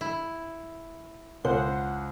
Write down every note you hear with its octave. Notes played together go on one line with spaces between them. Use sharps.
E4
C#2 C5 F#5